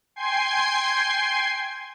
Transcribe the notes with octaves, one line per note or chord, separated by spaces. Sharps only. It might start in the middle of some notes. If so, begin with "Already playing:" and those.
G5 G#5 C6 G#6 C7